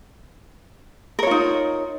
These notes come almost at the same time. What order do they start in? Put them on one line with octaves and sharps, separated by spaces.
A#4 C#5 F4 D#4